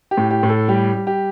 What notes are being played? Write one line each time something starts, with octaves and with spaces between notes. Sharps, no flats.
G4
A2
G4
A2
A4
G3 G4
G3
G4